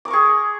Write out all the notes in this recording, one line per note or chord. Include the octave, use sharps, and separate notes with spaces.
G#4 A#4 C#6 D6